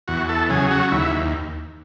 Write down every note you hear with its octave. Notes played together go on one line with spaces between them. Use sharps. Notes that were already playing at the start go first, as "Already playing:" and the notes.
E2 F#4
A4
C#3 F#3 G#4
F#4
D#2 E4